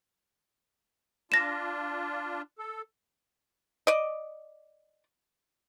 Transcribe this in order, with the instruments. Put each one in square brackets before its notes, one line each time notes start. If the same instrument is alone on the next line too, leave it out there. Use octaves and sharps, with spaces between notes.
[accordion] D4 F4 [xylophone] A#6 E7
[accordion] A4
[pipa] D5 D#5